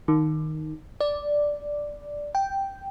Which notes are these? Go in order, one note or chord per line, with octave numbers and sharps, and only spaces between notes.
D#3
D5
G5